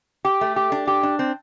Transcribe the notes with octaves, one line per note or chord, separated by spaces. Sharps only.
G4
A3
G4
D4
G4
D4
C4